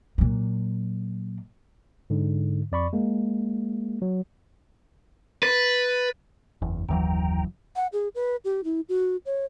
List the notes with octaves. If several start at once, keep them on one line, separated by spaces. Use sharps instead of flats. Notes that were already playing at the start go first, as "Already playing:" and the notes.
A#2 F#3
G#2 D3
F2 D5 B5 C#6
G#3 A#3
F#3
B4 A6
F#1 E2
F#1 D#2 E3 F#3 G5 A#5
F#5
G#4
B4
G4
E4
F#4
C#5